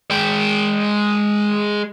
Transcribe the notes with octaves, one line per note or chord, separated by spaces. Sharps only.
G#3 G5